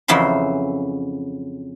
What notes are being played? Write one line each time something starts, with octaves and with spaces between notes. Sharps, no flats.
F2 C#3 E3 F#3 C5